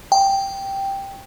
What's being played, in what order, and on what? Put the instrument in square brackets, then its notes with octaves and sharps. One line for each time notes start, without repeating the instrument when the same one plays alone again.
[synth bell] G5